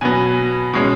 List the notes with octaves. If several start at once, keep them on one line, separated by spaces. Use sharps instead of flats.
B2 F#3 B3 G#5
B2 G#3 C#4